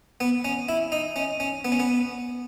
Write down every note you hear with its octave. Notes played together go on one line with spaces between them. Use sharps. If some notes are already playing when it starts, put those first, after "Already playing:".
B3
C#4
E4
D#4
C#4
C#4
B3
C#4
B3